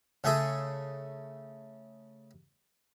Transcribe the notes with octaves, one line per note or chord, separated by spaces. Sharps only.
C#3 A3 G#4 A4